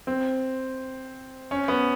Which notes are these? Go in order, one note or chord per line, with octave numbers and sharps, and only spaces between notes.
C4
C#4
B3